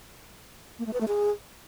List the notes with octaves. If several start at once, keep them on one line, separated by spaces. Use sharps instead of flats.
A#3
A3
B4
A3
G#4